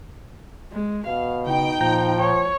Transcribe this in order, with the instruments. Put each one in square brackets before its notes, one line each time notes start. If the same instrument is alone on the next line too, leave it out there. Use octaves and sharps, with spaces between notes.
[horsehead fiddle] G#3
[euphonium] B2 [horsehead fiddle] F5
[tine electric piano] C#3 [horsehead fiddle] D#4 [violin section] G5
[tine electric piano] A#2 A#5 G6 [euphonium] F3
[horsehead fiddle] C#5